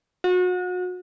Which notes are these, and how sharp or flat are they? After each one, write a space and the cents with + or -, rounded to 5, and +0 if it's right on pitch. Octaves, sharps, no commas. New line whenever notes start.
F#4 -35